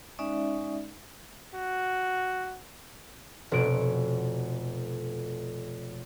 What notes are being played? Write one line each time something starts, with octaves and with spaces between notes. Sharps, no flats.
G#3 C#4 D#4 D5 E5
F#4
F1 B2 F#4 D7